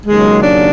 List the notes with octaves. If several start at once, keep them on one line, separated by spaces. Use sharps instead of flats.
D#2 C#3 F#3 G#3
D4